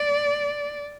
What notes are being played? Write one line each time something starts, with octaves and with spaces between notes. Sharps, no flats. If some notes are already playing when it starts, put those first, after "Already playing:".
Already playing: D5